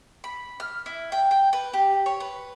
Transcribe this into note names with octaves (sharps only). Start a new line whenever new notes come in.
B5
F6
E4
G5
G5
B4
G4
C#5
B4